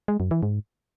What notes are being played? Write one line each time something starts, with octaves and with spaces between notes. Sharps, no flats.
G#3
F#2
E3
G#2